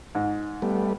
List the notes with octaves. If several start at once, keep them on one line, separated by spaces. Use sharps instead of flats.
G#2
G3 A3 B3